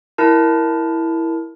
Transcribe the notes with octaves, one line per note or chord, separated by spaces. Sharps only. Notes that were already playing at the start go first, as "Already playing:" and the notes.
E4 A#4 A5